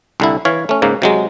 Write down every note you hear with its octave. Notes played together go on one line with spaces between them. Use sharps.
C2 D3 E4
E3 C#5 F5
A3 C#4
G#2 C#3 A#3
C3 F#3 G#3